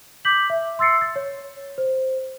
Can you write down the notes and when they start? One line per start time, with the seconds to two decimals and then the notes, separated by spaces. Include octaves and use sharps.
0.25 D6 G6 B6 F#7
0.50 E5
0.79 C6 E6 A6 C7 C#7
1.01 A6
1.16 C#5
1.78 C5